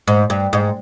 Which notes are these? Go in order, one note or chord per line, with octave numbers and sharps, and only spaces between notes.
G#2
G2
G#2